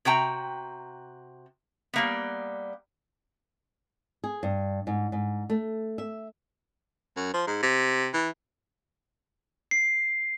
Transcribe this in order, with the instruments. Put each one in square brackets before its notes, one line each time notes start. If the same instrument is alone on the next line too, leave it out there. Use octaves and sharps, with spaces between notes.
[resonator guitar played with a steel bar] C3 F#4 G5 A#5
G3 A#3 B3
[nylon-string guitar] G#4
G2
G#2
G#2
A3
E5
[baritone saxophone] F#2
F3
G#2
C3
E3
[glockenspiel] C7